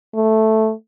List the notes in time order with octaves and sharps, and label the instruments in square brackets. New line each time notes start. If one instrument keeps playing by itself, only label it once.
[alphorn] A3